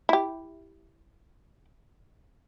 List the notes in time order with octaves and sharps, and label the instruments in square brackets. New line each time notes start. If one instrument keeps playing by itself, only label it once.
[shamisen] E4 G4